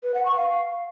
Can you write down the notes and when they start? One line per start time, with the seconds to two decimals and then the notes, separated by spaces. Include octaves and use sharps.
0.03 B4
0.14 F#5
0.25 C#6
0.36 F5